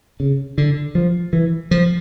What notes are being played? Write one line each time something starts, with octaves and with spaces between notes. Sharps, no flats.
C#3
D3
F3
E3
F3